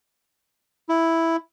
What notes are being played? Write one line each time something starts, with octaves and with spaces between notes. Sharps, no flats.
E4